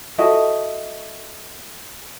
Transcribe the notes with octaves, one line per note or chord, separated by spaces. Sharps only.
E4 F#4 A4 D#5